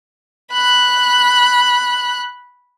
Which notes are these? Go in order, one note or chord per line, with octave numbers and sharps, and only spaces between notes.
B5 F#6